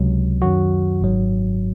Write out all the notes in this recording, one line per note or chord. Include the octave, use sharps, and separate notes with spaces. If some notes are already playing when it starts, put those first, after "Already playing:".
Already playing: C#2 C3 F#3
F#2 D#3 F#3 F#4
G#1 G#2 F#3